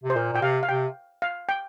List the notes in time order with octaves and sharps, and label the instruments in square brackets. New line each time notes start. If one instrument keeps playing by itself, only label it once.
[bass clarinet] C3
[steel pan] C5
[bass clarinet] A#2 [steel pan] A#4
[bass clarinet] A#2 [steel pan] G5
[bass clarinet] C3 [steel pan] F5
[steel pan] F5
[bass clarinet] C3 [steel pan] G5
[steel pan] F5
G5